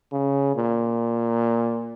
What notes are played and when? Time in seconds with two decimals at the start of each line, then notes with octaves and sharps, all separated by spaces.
0.12 C#3
0.56 A#2